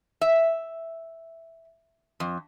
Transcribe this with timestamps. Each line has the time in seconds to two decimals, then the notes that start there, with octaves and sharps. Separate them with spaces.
0.21 E5
2.20 F2